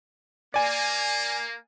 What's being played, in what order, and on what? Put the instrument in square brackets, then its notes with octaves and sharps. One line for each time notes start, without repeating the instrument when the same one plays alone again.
[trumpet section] A#3 [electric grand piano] D5 G#5